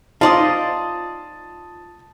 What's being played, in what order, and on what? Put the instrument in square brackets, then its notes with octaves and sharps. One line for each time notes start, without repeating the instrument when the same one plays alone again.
[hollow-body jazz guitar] D#4 F4 [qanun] C5 D5 D#5 [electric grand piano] A5 D#6